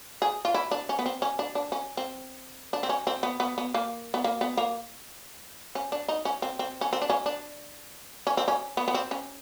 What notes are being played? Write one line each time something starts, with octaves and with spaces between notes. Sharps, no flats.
G#4
F4
E4
D4
C#4
B3
C4
C#4
D4
D4
C#4
C4
D4
C4
C#4
C4
B3
B3
B3
A#3
B3
A#3
B3
A#3
C#4
D4
D#4
C#4
C4
C4
C#4
C4
D4
C#4
D4
C#4
C4
C#4
B3
B3
C4
C#4